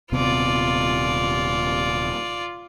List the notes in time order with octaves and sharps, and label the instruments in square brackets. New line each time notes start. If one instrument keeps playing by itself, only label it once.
[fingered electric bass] D#1 C3 B3 [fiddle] F4 D5